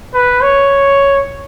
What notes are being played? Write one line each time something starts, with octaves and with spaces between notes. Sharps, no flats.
B4
C#5